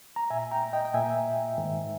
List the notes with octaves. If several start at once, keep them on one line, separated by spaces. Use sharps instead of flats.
A#5
A#2 E5 G#5
G5 A#5
D#5 G5
G5
A#2 E5 G#5
G#2 D#3